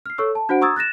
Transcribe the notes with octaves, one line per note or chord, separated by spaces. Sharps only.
F6 C7
A4 C#5 C#6 E6
A5
D4 F#4 C5 F#5 D7
A#5 C#6 D#6 E6 G#6 A6
F#6 A6 A#6 E7